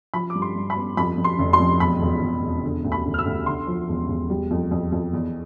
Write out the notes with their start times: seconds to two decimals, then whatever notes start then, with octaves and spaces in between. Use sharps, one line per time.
0.14 F3 B5
0.30 D6
0.35 G2
0.42 C6
0.56 G2
0.70 B5
0.76 B3
0.97 F2 B5
1.17 F2
1.24 C6
1.39 F1
1.53 C6
1.60 F2
1.80 E1 B5
2.01 E1
2.22 E1
2.43 E1
2.63 D3
2.84 D2
2.92 B5
3.06 D2
3.14 F6
3.19 E6
3.25 D2
3.46 D3 C6
3.67 F3
3.89 E1
4.09 E1
4.30 G3
4.51 F2
4.71 F2
4.92 F2
5.13 E2